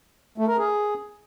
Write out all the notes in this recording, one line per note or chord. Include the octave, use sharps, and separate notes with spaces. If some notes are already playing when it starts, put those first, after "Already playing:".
A3
A#4
G#4